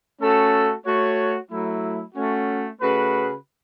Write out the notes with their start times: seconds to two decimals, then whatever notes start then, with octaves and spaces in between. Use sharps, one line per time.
0.20 A3 C#4 F#4 A4
0.85 A3 F#4 C#5
1.51 F#3 A3 E4
2.15 A3 C#4 F#4
2.80 C#3 A3 F#4 B4